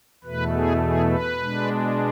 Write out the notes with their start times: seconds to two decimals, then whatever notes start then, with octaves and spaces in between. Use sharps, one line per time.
0.24 E2 B2 A3 B4
0.53 G#4
0.82 G#4
1.09 B4
1.38 B2 G#3 D4